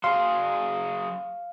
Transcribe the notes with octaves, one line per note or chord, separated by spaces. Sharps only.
F#3 G#4 F5 C6